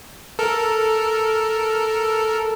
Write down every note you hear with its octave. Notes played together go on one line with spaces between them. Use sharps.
A4 A#4